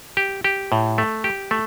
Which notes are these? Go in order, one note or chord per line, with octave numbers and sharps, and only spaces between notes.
G4
G4
A2
A3
G4
A3